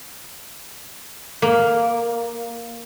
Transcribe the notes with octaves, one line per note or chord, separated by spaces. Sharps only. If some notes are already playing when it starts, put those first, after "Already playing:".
A#3